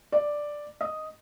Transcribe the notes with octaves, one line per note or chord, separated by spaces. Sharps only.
D5
D#5